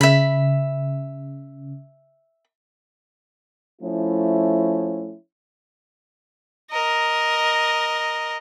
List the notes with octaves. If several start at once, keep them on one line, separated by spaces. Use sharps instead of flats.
C#3 E5 B5
F3 A3 C#4 E4
A#4 D#5